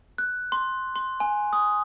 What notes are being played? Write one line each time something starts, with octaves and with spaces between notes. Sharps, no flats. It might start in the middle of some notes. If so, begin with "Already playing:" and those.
F#6
C6
C6
G#5
D#6